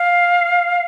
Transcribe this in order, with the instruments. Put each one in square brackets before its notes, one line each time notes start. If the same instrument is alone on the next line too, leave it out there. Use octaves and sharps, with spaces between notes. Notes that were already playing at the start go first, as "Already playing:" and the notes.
Already playing: [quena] F5